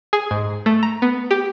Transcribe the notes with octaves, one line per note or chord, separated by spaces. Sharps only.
G#4
G#2
A3
A#5
B3
G4